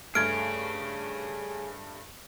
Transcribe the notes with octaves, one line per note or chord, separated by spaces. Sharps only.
G2 A3 G#4 C#5 F6 G#6 D7